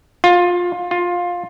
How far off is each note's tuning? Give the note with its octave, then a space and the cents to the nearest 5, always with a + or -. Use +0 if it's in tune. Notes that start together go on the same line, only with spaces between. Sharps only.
F4 +20
F4 +15